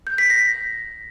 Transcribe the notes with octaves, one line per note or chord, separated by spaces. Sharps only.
G6
B6
A#6